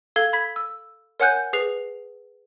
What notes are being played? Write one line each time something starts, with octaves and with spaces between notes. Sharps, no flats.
A4 F5 G#6 G7
B5 G#6 B6
E6
A#4 C#5 F#5 G#5 F#6 G6
G#4 B4 C7 F7